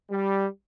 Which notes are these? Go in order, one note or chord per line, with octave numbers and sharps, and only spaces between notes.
G3